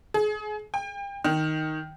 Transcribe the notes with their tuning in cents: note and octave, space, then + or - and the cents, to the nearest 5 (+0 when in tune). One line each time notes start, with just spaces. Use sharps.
G#4 +30
G5 +35
D#3 +0